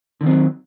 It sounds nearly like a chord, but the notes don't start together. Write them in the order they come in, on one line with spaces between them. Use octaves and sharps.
D3 D#3 C4 F#3